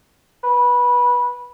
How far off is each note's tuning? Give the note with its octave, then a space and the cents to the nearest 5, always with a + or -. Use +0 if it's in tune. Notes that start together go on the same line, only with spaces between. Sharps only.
B4 -20